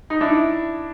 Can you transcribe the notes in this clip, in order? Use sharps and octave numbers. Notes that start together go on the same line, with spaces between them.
D#4
D4 E4